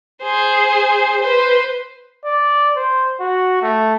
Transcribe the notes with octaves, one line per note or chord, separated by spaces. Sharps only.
G#4 C5
B4 C5
D5
C5
F#4
A3